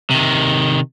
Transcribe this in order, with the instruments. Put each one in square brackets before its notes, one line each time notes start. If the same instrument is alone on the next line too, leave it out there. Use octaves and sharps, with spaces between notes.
[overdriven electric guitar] C3 D#3